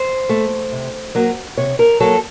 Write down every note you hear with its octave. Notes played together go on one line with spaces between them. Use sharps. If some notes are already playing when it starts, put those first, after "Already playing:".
Already playing: C5
A3
C3
F#3 A#3
C3 C#5
A#4
F#3 A#3 A4